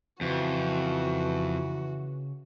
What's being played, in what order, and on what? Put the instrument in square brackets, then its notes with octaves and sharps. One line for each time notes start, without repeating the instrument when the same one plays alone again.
[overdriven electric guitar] F2 [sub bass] C#3 [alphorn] E3 [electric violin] F#4